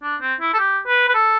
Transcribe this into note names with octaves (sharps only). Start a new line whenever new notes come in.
D4
C4
E4
A4
G4
B4
B4
A4